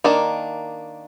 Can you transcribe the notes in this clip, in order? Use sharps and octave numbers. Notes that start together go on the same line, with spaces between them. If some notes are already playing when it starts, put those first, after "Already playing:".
D#3 A#3 D4